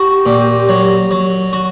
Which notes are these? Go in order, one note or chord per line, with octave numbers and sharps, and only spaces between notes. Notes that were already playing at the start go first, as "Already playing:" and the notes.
Already playing: F#4 G4
A#2
F#3
F#3
F#4